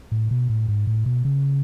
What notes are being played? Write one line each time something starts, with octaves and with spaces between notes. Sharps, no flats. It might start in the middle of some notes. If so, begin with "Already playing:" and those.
A2
B2
A2
G#2
A2
B2
C#3